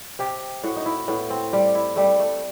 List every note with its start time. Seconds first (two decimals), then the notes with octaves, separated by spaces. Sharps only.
0.19 C3 G4
0.63 A2 F#4
0.76 D#4
0.86 E4
1.08 A2 B3
1.30 C4
1.53 G3 G4
1.75 E4
1.96 G3 A3
2.19 A3